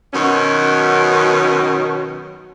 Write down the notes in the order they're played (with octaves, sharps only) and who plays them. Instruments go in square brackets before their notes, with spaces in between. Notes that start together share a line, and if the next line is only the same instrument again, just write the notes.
[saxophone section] F#2 B2 D#3 C#4